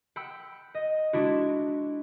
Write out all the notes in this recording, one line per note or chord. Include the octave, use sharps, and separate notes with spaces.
F#5 G5 B5 E6
D#5
G#3 D4 E4 F#4